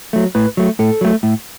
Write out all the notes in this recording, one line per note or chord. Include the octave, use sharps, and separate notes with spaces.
F#3 A3
A2 B4
F#3 A3
A2 A4
F#3 A3
A2